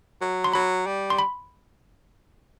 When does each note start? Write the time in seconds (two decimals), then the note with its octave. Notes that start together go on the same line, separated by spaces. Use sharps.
0.21 F#3
0.44 C6
0.54 F#3 B5
0.87 G3
1.10 C6
1.19 B5